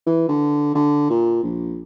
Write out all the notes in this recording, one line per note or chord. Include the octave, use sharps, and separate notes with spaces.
E3
D3
D3
A#2
A#1